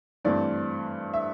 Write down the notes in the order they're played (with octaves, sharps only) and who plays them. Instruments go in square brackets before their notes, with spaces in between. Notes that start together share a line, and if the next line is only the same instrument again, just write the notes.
[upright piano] G2 E3 A3 C4 D5
E5